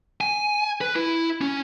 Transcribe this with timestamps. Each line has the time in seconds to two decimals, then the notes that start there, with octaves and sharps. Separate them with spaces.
0.21 G#5
0.81 B4
0.96 E4
1.41 C#4